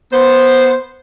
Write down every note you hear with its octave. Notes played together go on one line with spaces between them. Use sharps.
B3 C5